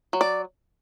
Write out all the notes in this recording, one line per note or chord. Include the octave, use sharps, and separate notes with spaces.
F#3
D5